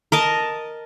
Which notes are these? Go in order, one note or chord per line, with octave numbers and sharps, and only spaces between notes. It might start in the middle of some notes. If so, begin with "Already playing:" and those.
A#4 D#5 A5